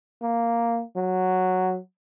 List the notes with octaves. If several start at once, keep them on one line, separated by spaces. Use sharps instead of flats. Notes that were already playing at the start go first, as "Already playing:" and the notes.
A#3
F#3